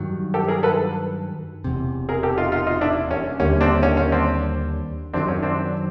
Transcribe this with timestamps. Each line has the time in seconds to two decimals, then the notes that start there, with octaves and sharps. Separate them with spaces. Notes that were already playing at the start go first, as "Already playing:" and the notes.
Already playing: G2 D#3 F#3
0.34 G4 A4
0.48 G#4 A#4
0.63 A4 B4
1.64 E1 E2 C3
2.09 G#4 A#4
2.23 G4 A4
2.38 D#4 F4
2.52 D#4 F4
2.67 D#4 F4
2.81 D4 E4
3.11 C#4
3.40 D#2 D3 G3 A#3 C#4
3.61 C4 D4
3.83 C#4
3.97 C#4
4.12 C4 D4
5.13 F#2 D#3 F#3 C4 D4
5.28 C#4
5.42 C4 D4